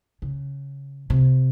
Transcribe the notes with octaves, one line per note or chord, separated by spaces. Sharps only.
C#3
C3